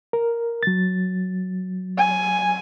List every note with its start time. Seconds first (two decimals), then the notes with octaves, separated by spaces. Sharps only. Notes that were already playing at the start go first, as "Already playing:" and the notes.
0.13 A#4
0.63 F#3 A6
1.98 G#5